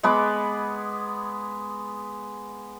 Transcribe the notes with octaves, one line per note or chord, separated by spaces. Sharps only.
G#3 B3 B5 D6